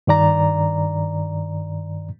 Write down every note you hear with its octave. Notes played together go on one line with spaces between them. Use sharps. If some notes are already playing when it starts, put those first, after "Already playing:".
G2 D#3 D5 A#5